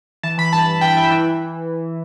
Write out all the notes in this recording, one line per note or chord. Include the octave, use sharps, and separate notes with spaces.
E3 A5
E3 B5
G2 A5
G2 A5
E3 G5
E3 E5
E3
E3